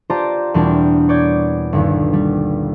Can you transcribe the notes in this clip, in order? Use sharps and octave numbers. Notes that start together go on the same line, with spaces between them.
F4 G4 C5 D5 A5 A#5
E2 B2 G3 C4 D4 A#4
C#5 D5 G6 G#6
G1 D#2
G3